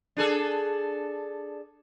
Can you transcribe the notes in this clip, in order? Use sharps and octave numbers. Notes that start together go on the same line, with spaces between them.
D4 G#4 A4